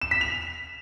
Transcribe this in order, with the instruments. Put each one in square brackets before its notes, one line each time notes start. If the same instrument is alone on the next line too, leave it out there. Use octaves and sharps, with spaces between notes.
[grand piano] E7
B6
F7